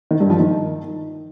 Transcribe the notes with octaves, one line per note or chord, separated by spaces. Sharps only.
D#3
G2
F3
D#3